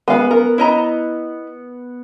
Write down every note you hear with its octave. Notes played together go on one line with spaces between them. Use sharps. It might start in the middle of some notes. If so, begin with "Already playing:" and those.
G#3 B3 F5
A#4
E4 D#5 A#5